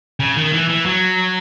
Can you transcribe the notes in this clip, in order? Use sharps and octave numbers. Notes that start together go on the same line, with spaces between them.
C#3
D#3
E3
E3
F#3